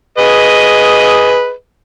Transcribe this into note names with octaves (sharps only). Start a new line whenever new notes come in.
G#4 B4 D#5